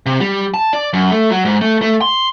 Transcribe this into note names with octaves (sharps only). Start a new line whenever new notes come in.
C3
G3
A5
D5
F#2
A3
F#3
G#2
A3
A3
C6